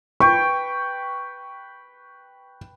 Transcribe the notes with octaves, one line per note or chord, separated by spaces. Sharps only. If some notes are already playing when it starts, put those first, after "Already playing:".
B4 G5 C#6